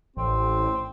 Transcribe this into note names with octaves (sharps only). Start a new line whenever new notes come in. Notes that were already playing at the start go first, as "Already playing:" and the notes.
A1 C4